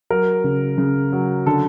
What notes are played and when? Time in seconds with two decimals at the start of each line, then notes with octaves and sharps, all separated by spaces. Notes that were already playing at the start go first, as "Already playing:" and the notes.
0.10 F#3 A#4
0.44 C#3
0.78 C#3
1.12 F#3
1.46 D3 A4